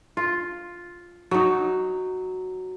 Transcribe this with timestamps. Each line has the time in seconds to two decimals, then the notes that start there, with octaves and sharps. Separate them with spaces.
0.17 F4
1.31 F#3 D#4